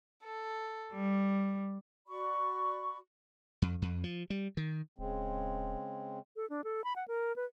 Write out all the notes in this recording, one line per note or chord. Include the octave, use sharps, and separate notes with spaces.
A4
G3
F#4 D5 B5 C#6
F2
F2
F3
G3
D#3
D#1 C#3 G#3 C4
A4
D4
A4
B5
F#5
A#4
B4